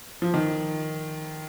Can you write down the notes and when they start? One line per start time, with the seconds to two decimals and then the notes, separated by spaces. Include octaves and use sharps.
0.22 F3
0.34 D#3